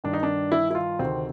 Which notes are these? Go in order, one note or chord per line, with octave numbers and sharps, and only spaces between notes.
G2 D#3 D4
D#4
D4
E4
E4
F4
D2 C3 D#3 C4